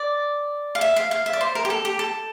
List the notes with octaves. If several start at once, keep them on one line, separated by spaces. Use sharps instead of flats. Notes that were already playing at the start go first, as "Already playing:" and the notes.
Already playing: D5
F5
E5
F5
F5
E5
D5
C5
A#4
G4
A4
G4
A4